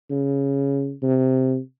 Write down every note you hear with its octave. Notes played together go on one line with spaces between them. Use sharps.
C#3
C3